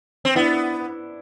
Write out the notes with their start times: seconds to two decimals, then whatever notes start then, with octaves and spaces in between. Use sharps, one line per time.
0.25 C4
0.35 B3 D4 E4